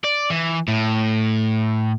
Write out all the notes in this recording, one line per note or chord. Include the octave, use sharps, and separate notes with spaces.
D5
E3
A2